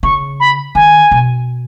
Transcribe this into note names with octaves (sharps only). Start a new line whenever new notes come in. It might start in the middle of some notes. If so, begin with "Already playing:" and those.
C#3 C#6
B5
D#3 G#5
B2